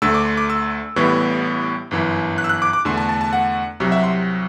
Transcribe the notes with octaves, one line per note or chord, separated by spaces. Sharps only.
D2 D3 A3 E6
D6
C6
D6
E6
A1 A2 E3 G3 B3
G1 F#2 E3
F#6
E6
F#6
D6
D6
E2 D3 A3 C6
A5
A5
A5
F#5
C2 C3 F#3
E5
C6